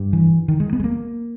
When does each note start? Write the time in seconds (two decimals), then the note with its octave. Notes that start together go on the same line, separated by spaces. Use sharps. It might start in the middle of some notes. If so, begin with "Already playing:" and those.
Already playing: G2
0.13 E3
0.48 D#3
0.60 G#3
0.73 B3
0.80 G#3
0.84 A#3